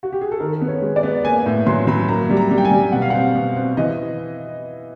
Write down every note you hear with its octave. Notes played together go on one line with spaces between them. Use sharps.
F#4
G4
G#4
A4
D#3 A#4
B3
C#5
G#3
D5
B3
A#3 G#5
A2
F#3 C6
F#3 B5
A#3 A#5
G3
A#5
G3
G5
G#5
G3
B2 F#5
F5
C4 F#5
B2
C4
E3 D#5